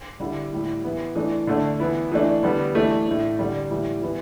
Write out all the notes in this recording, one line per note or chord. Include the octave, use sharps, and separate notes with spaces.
D3 G3 E4
A2 G3 E4
E3 B3 E4
E3 A3 D4
D3 A3 D4
E3 B3 E4
E3 A3 D4
D3 G3 B3
E3 A3 D4
A2 A3 D4
D3 G3 D4
A2 E3 G3
E3 B3 E4